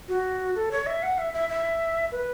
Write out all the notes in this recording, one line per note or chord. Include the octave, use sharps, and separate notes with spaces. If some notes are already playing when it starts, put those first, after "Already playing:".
F#4
A4
C#5
E5
F#5
E5
E5
E5
B4